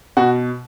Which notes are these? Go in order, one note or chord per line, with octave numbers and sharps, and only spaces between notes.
B2 F#4